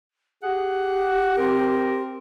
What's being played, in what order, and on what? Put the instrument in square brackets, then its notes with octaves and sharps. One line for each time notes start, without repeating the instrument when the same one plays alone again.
[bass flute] G4 [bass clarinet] G#4 [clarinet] F#5
[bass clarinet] C4 [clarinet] A#4